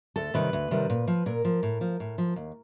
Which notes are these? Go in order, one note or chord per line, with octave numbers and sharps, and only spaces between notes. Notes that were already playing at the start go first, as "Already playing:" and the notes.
D2 A4
C3 D#3 G3 B4
D2
C3 D#3 G3
A#2
F3
A#2 A#4
F3
A2
F3
A2
F3
D#2